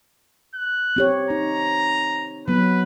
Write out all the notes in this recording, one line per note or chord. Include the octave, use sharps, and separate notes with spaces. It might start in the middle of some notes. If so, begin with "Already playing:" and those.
F#6
C4 G4 C#5
D#4 A#5
F#3 B3 B4